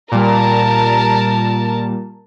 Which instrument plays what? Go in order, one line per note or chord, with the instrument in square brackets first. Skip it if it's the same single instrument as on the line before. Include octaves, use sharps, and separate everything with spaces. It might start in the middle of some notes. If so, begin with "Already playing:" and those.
[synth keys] A#2 G3 [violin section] A#4 A5